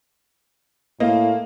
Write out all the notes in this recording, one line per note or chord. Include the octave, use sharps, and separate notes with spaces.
A2 A#3 D#5 F5